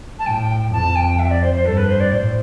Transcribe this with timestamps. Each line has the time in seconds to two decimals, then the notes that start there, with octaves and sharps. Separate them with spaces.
0.19 A5
0.26 A2 G5
0.42 G5
0.72 F2 A5
0.95 G5
1.19 E5
1.30 D5
1.42 C5
1.53 C5
1.65 G2 A4
1.77 B4
1.88 C5
2.00 D5
2.11 A2 C5